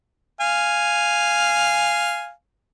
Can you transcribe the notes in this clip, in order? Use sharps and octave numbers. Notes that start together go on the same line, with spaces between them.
F5 G#5